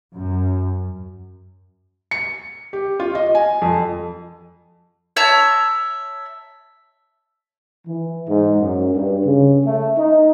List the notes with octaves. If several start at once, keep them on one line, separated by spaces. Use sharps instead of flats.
F#2
C#7
G4
F4
D#5
G#5
F2
C#5 E5 A5 A#5
E3
G#2
F#2
G2
C#3
A3
D#4